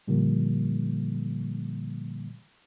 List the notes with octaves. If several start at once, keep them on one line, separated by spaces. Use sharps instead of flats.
A#2 D3 F3 G3 A#3